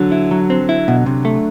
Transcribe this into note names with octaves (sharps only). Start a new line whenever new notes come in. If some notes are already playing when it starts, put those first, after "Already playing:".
Already playing: D3 F#3
E4
F#3
C4
E4
B2
C3
A3